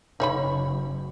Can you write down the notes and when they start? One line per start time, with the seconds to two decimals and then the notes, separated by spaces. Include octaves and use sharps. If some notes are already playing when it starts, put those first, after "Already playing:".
0.20 F#1 D#4 C#5 B5